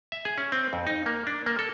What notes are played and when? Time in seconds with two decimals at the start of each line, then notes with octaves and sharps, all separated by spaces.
0.12 E5
0.25 G#4
0.38 C#4
0.52 C4
0.73 F2
0.87 D#4
1.06 A#3
1.27 D4
1.46 A#3
1.59 A4